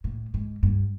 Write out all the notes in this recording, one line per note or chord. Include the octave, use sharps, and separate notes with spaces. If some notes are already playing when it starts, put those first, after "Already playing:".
A2
G#2
G2